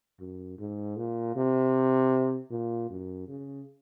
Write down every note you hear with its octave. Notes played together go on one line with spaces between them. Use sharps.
F#2
G#2
A#2
C3
A#2
F#2
C#3